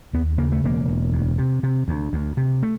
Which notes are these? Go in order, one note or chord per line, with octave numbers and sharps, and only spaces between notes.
D#2 B3
C#3 A#3
A3
E1 A#3
E1
D2
C3
C3
D2
D2
C3
A3